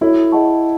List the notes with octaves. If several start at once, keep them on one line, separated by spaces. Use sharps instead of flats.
E4 F#4 A4 C#5
G#4 D#5 F#5 A5 C#6